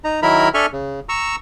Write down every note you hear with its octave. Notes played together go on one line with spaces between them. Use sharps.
D#4 A#5
D#3 F#3 E4 A#4 A#5 B5
D4 A4 E5 G#5 C#6 F6
C#3
A#5 C#6 E6